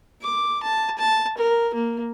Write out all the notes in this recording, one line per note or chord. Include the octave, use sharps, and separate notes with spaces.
D6
A5
A5
A#4
A#3